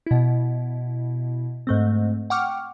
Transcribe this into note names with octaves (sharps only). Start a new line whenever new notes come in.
B2 E4
G#2 A3 C4
F#5 G5 C#6 D6 F6